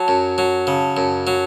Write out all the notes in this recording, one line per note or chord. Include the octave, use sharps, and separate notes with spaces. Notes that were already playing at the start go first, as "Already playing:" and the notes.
Already playing: F#3 A5
F#2
F#3
C#3
F#2
F#3